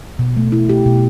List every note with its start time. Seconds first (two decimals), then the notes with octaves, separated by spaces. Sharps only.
0.19 B2
0.37 A3
0.52 E4
0.69 G4
0.86 B2